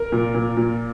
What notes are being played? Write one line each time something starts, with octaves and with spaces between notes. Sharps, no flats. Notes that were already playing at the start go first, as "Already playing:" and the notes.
Already playing: A#4
A#2
A#2
A#2